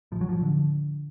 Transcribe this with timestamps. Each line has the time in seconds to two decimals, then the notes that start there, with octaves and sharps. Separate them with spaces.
0.12 A1 F3
0.21 F#3
0.29 F3
0.41 D3